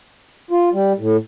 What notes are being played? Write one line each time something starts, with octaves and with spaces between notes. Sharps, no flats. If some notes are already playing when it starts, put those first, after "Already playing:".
F4
G3
A2